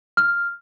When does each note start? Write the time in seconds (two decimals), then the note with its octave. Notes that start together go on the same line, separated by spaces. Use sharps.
0.17 F6